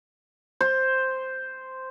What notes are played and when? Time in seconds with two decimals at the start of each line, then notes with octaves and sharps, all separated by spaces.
0.61 C5